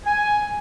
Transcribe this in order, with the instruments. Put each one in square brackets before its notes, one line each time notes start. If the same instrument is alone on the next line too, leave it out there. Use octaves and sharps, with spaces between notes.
[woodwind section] G#5